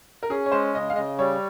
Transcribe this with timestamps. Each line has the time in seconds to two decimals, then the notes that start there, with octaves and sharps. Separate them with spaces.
0.23 A#4
0.30 C#4 G#4
0.46 C#5
0.52 G#3 C5
0.74 C#3 D#5
0.90 F5
0.96 C#3 D#5
1.19 G3 C#5